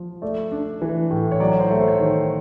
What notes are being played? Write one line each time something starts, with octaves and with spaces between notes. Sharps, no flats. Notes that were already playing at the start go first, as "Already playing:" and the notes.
Already playing: F3
A3 D5
D4
E3
A2
C#5
F#3 D5
C#5
C5
A3
C5
C#5
D#3 C5